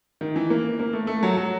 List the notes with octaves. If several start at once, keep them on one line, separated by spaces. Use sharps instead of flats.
D#3
E3
A#3
A#3
A3
A3
F#3
F#3